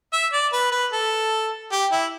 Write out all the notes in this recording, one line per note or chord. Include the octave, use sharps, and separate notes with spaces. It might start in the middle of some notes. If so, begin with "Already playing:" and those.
E5
D5
B4
B4
A4
G4
E4